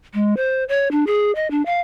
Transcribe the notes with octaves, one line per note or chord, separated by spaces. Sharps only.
G#3
C5
C#5
D4
G#4
D#5
D4
F5